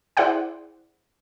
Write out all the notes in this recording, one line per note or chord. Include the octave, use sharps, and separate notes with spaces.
E4 G#4 C5 D5 F#5 G5